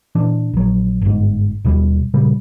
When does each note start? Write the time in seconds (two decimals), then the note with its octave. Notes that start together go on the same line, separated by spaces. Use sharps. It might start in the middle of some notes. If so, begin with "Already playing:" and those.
0.15 A#2 E3 D4
0.54 A#1 F#3
1.02 G1 G#2
1.65 D#2 B2 G3
2.14 A#2 C#3 G3